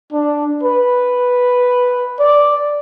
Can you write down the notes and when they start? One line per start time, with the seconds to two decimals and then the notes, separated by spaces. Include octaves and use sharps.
0.12 D4
0.63 B4
2.20 D5